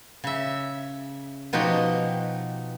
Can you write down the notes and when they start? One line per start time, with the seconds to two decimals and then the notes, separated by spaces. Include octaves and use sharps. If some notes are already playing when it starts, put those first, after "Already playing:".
0.24 C#3 E5
1.53 B2 F3 D#4 F#4 G4